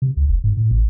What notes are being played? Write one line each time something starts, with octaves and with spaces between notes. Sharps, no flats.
C3
C#2
F1
G#2
A2
A1